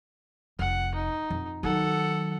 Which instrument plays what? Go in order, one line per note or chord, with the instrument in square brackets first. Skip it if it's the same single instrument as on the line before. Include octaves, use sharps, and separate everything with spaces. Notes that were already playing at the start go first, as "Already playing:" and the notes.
[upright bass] F1 [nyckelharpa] F#5
[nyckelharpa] D#4
[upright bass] F2
[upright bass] D#3 F#3 [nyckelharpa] A4 F#5